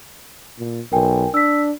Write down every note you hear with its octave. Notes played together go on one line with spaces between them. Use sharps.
A#2
B1 A#4 G5 G#5
D4 E6 B6